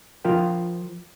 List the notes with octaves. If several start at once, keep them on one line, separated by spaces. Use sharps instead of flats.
F3 F4 A#4 G5